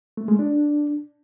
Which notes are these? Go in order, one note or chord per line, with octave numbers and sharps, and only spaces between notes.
A3
G#3
D4